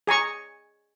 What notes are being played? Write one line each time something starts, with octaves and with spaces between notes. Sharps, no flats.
G#4 G#5 A#5 C#6